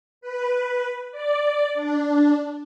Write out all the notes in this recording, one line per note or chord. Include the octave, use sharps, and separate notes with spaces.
B4
D5
D4